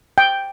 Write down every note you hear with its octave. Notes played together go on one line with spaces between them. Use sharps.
G5